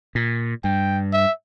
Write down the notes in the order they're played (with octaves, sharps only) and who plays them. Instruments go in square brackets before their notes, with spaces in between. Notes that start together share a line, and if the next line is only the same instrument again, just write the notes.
[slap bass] A#2
[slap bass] G2 [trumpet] G5
[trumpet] E5